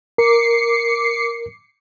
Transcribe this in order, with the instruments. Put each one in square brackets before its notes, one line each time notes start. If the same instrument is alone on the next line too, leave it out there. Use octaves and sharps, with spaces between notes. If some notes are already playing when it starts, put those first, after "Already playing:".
[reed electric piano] A#4 [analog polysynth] D6 C7 C#7